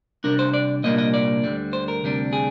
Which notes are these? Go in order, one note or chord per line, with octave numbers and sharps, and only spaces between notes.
C3 G3 D4 A#4
C5
D5
C2 A#2 G3 A#3 D4 D#5
D#5
D5
D2 D3 G3
C5
A#4
D2 C3 G3 D4
G#4